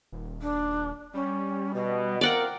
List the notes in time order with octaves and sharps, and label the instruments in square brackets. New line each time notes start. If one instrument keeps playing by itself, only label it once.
[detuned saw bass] D#1
[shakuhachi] D4
[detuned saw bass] G3 [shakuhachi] C#4
[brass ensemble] B2 [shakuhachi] D#5
[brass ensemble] C4 F4 A#4 [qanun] D5 F#5 G5